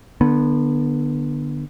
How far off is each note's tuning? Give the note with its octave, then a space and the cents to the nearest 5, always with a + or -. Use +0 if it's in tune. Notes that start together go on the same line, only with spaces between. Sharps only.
D3 +20 B3 -20